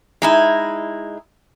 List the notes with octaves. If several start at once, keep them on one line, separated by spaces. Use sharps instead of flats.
G#3 D#4 E4